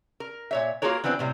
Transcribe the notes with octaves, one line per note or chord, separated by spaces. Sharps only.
A#4
A#2 C#5 E5
A#3 F4 F#4 G#4 A#4 C#5
E3 F#3 B3 C4 D4
A2 C3 G3